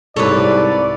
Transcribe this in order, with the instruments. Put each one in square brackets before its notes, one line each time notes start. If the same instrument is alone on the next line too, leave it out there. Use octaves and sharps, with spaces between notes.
[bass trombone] C2 [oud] G#2 A4 [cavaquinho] B4 C#5 [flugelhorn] D5